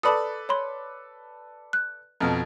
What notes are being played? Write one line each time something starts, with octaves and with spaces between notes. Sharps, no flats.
A4 B4 D5 A5 B5 D#6
C#5 B5 C6
F#6
F2 B2 A#5 F6